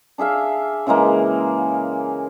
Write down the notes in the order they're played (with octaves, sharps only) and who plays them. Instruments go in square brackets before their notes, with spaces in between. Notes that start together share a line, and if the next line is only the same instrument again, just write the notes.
[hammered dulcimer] D4 G#4 E5 F5
C#3 E3 G#3 A#3